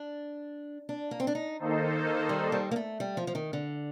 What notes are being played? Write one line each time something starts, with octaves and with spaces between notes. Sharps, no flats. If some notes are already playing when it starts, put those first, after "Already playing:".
Already playing: D4
D4
A#3
C4
D4
D#4
D#3 A#3 D#4 A4 C5
G3
G3
A#3
A3
G3
F3
F3
D#3
D3